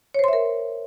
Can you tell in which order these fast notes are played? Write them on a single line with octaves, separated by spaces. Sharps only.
C#5 C5 C6 E5 A#4